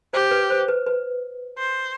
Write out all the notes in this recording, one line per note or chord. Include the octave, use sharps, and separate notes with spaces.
G4 C5
B4
C5
B4
B4
C5